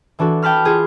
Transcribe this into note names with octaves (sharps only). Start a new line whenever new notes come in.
E3 D4 F#4 A4
G5 A5 B5 F6
F4 G#4